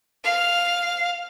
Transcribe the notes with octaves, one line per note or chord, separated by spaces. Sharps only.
F5